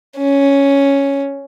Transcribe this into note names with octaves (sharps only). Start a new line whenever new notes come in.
C#4